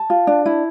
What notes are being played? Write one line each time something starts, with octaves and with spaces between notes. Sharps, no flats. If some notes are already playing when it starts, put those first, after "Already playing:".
Already playing: A5
F4
D4
E4